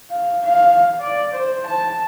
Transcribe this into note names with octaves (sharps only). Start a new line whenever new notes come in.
F5
F5
D5
C5
A5